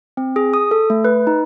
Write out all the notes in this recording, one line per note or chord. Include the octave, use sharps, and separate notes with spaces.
C4
G#4
D#6
A4
A3
B4
D#4